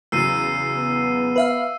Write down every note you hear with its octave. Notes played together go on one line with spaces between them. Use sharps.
E2 C#3 F#3 E6 C7 D#7
B3
B4 E5 F5